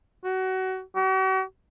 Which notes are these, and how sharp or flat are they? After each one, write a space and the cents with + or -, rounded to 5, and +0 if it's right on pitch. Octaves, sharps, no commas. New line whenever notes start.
F#4 +25
F#4 +45